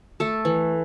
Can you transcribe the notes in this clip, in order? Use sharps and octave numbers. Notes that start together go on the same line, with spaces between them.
A3 A4
E3